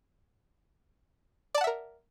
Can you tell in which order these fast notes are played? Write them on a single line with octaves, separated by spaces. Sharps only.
D5 A5 F#5 E5 A#4